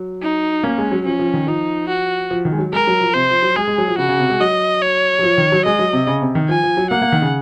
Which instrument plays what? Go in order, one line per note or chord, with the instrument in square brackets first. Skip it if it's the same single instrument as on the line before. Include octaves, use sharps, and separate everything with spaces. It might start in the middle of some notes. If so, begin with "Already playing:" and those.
Already playing: [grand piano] F#3
[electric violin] D#4
[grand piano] A#3 [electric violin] C#4
[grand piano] G#3
F#3
[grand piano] F3 [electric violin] C#4
[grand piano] F3
D#3
[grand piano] F3 [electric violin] D#4
[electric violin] F#4
[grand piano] F3
D#3
G#3
F#3
[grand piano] G#3 [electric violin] A#4
[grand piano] F#3
F3
[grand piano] C3 [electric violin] C5
[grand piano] F3
F#3
[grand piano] G#3 [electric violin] G#4
[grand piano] G#3
F#3
F3
[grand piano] C#3 [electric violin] F#4
[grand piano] C#3
C3
G#3
[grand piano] F#3 [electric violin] D#5
[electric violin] C#5
[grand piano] F#3
F3
D#3
F#3
[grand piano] G#3 [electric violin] D#5
[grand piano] F#3
C3
C#3
C3
D#3
[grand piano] F3 [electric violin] G#5
[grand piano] F3
F#3
[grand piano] A#3 [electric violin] F#5
[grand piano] A#3
D#3
C#3